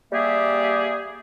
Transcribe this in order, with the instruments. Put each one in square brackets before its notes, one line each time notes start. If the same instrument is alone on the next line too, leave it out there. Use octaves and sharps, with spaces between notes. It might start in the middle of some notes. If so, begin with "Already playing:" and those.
[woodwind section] G3 A#3 G4 G#4 E5